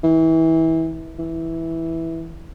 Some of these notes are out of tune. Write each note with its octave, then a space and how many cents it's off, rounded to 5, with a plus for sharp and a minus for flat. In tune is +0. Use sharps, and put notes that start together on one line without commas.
E3 -25
E3 -10